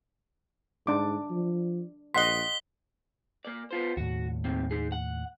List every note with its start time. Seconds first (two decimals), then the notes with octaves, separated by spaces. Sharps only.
0.87 G#2 D4 D6
1.30 F3
2.14 A#1 D#5 F#5 C6 B6 G7
3.45 A#3 D5
3.71 B3 F4 C5
3.97 D#2 A2 F#4
4.44 D#3 A#3 C4
4.71 D#4 G#4
4.92 F#5